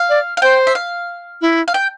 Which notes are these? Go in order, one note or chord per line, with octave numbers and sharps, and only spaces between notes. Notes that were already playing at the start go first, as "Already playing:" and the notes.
Already playing: F5
D5
F5
C5 G5
E5
F5
E4
F5
G5